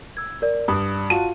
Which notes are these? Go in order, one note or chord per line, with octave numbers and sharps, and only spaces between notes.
E6 G#6
A#4 D5
G2 D#6
F4 F#4 A5 D#7